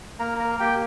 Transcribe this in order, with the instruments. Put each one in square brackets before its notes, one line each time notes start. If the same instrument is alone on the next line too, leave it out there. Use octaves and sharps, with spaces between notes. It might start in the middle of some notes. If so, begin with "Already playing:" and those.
[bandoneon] A#3 A#4 A#5
A#4 A#5
A#3 G4 G5